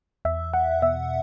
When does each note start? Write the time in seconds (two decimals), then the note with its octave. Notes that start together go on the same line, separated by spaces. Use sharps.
0.25 E2 E5
0.53 E2 F#5
0.82 B2 E5